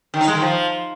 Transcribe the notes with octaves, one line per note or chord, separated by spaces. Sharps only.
D#3
D#4
G#3
D#3
F3